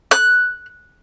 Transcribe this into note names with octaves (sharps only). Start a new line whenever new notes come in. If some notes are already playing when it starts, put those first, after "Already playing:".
F#6